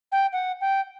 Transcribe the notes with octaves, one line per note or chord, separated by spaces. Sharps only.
G5
F#5
G5